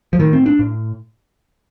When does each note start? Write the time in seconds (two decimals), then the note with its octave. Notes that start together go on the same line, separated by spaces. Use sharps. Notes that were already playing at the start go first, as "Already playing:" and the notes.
0.13 F3
0.19 A2 D#3
0.33 C4
0.46 D4
0.59 A2